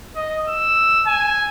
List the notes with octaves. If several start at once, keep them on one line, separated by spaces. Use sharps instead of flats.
D#5
E6
G#5